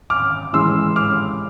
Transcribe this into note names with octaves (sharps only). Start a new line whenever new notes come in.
D6 F6
A2 E3 G#3 C6 E6
D6 F6